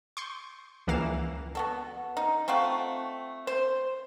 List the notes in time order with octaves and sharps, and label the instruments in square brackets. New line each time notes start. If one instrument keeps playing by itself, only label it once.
[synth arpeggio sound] C6 C#6 G6
C#2 E3 A#3 F5 E7
[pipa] B3 F#4 A4
D#4
A3 C4 F4 F#4
C5